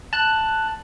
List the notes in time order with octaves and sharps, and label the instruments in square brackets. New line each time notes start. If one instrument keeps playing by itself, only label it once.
[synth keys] A5 F#6